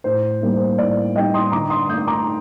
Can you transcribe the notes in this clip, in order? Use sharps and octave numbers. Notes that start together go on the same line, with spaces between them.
A2 C5
G3 A#3 D#4
C5
A2 D5
G3 A#3 D#4 D#5 G5
C6 D#6
D3 A#5 D6
C6 D#6
A3 D#4 D#6 G6
A#5 D6